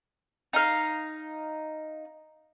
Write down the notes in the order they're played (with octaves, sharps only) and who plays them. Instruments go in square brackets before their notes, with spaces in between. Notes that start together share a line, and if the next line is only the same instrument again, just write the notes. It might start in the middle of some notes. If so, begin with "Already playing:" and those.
[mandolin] D#4 F5